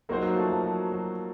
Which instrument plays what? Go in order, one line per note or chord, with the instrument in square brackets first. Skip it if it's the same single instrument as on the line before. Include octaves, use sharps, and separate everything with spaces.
[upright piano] F#3 [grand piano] A#3 D#4 F#4 C5
[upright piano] F#3
F3 A3
F3 A3
F#3
F#3